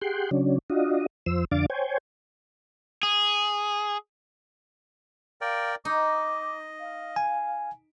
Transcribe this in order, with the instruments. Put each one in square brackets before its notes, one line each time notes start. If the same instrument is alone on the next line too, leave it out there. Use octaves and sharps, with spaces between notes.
[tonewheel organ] G4 G#4 F#5 G5 C6
C#3 F#3 C#4 D4
D4 F4 F#4 D#5
F2 F3 C5 E6
F2 D3 D4 F5 D6 A6
C5 C#5 G5 G#5
[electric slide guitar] G#4
[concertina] A#4 D5 G5 [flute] F5
[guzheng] D#4 [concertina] D#5 [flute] D6
[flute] F5
[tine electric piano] G#5